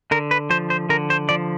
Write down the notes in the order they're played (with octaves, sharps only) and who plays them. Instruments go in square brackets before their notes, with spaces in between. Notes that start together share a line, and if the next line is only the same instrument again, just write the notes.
[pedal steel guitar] D3 A#4
B4
F3 C5
C5
D3 A#4
C5
F3 D5